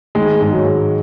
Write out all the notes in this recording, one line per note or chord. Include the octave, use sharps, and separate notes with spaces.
D#3 G#3
G#2 G#3
F#3
G#2